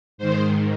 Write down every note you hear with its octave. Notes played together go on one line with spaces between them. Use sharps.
G#2 D#3 C5